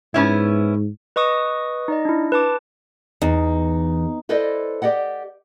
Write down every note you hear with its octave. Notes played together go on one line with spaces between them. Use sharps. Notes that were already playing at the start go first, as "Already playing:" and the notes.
G#2 B3 C#4 E4
B4 D#5 C#6 D#6
D#4 D5 D#5
D4 E4
B4 A5 D6
E2 D#4
E4 A4 B4 C5 D5 D#5
G4 D5 D#5 F#5